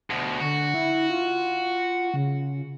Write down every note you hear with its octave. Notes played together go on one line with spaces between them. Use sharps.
D2 B2
D3 F#4
E4
F4
C#3